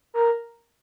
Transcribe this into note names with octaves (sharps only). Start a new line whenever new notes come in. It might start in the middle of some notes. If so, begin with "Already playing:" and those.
A#4